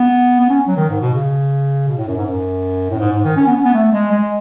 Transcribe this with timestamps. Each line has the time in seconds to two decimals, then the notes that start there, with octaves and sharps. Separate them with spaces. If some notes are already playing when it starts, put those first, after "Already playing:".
Already playing: B3
0.40 B3
0.50 C#4
0.68 F#3
0.77 D#3
0.90 G#2
1.01 B2
1.14 C#3
1.88 B2
1.98 A2
2.08 F#2
2.17 G#2
2.26 F#2
2.90 A2
3.00 G#2
3.12 G#2
3.24 D#3
3.36 C#4
3.47 B3
3.56 C#4
3.64 B3
3.74 A3
3.93 G#3
4.11 G#3